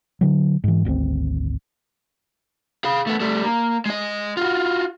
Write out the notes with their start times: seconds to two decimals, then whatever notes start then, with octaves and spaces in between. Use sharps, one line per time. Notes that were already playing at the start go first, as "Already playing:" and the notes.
0.21 D3 F#3
0.64 G#2 E3
0.85 G#1 D2 C#3 C4
2.85 G#4 F5
3.07 A3 B3
3.20 G3 A3
3.44 A#3
3.86 G#3 D#5
4.37 F4 F#4